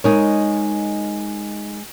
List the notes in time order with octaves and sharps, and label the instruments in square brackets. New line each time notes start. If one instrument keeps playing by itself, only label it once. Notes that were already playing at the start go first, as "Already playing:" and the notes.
[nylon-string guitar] G#3 D#4 A#4 C#5